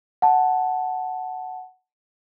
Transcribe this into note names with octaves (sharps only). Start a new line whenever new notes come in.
F#5 A5